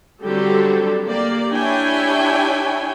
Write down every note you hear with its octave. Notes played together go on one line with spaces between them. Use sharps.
D3 F#3 G3 C4 G4 A4
A#3 G4 D5
D4 E4 G4 C#5 G5 G#5